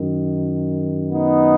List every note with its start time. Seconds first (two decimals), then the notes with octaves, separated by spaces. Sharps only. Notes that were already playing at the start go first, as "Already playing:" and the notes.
Already playing: F#2 D#3
1.12 B3 D#4